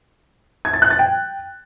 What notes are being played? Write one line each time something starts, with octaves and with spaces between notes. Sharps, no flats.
G#6
A6
F#6
A6
G5